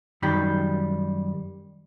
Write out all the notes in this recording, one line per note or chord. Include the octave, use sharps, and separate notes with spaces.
F#2 D#3 G3 G4 B5